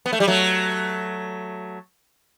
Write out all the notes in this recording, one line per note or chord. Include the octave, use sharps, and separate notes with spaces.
B3
A3
G3
F#3 A3